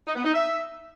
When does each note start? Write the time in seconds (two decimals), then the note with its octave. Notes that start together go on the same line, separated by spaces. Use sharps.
0.06 D#4
0.15 B3
0.24 D#4
0.33 E5